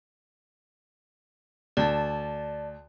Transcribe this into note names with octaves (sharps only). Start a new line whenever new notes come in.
D2 D5 A5